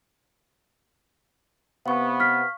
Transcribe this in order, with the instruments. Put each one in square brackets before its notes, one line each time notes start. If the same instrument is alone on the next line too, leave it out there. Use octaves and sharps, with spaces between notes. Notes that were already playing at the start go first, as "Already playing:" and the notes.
[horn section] C3 B3 [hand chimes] F5 C#6
[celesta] F6 B6